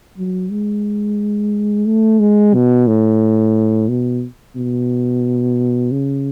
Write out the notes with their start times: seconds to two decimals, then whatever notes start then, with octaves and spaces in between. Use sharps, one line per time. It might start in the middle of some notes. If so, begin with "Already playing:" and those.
0.18 F#3
0.51 G#3
1.86 A3
2.20 G#3
2.54 B2
2.87 A2
3.89 B2
4.56 B2
5.91 C#3